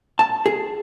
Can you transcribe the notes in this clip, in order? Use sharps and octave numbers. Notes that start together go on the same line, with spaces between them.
A5
G#4